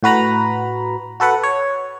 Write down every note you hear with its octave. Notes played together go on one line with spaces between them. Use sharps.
A2 F#4 B4 A#5 B5
F#4 A4 B4 F#5
C#5